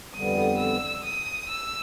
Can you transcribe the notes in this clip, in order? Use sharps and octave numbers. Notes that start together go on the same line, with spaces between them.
F2 D3 G3 B3 D#6
E6
D#6
E6